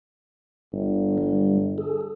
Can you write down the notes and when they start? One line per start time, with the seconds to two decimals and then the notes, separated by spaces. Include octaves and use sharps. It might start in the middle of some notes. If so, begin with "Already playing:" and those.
0.73 G1
1.18 G3
1.78 G#4 A4